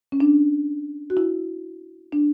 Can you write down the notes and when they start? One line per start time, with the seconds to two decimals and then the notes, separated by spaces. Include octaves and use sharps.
0.12 C#4
0.20 D4
1.10 F#4
1.17 E4
2.12 D4